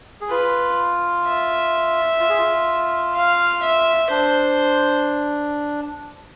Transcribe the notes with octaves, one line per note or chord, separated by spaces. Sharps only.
G#4
F4 B4
E5
F4
G#4
F4
F5
E5
D4 C5